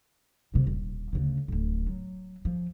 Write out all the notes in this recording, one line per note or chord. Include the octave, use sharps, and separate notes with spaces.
D#1 C3
D#1
D2 C#3
D1 A2
F#3
F3